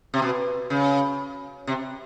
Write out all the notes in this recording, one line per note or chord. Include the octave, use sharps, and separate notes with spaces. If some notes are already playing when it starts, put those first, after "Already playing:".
C3
B2
C#3
C3